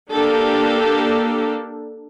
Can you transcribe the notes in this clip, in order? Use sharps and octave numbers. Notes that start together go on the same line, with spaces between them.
A#3 D4 G4 A4